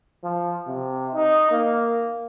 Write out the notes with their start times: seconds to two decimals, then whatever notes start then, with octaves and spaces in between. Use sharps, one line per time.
0.24 F3
0.68 C3
1.14 D#4
1.51 A#3